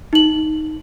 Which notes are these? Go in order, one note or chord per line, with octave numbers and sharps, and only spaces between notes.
D#4 F#7